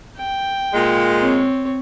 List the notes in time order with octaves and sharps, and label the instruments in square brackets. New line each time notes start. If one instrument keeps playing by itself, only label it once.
[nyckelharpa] G5
[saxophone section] A#2 G#3
[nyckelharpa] C4 C#5